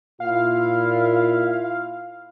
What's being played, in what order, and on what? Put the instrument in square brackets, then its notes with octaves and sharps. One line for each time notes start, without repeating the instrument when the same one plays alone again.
[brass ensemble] A#2 E4 F4 [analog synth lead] F5